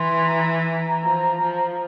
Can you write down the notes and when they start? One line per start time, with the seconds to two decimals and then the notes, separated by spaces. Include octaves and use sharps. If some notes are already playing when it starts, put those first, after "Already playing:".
Already playing: E3 C6
0.28 A#5
1.03 F3
1.42 F3